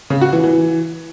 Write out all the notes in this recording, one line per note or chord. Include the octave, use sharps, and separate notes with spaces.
C#3
F#4
E3
E3